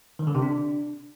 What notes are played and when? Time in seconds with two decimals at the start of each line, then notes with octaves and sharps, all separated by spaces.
0.19 D#3
0.27 D3
0.35 C3
0.42 D4